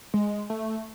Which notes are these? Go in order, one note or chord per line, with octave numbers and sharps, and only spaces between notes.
G#3
A3